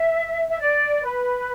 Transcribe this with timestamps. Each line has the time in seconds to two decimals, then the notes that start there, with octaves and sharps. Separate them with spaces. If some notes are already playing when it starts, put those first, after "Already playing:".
Already playing: E5
0.48 E5
0.59 D5
1.02 B4